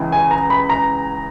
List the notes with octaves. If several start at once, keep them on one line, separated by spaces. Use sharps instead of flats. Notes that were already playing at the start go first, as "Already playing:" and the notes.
Already playing: C#2 C#3 E3
G#5
A#5
B5
A#5